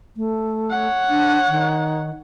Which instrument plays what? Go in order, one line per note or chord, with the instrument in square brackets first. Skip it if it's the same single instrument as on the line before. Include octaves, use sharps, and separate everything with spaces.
[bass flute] A3
[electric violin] C#5 F#5
[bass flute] D4
D#3